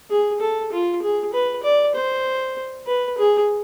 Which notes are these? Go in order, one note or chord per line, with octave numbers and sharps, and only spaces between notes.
G#4
A4
F4
G#4
B4
D5
C5
B4
G#4